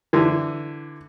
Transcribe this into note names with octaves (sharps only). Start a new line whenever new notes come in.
D3 E3